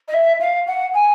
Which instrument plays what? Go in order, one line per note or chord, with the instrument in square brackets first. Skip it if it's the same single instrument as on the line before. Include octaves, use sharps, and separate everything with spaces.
[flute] D#5
E5
F5
F#5
G#5